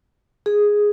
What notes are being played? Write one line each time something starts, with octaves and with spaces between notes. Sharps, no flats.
G#4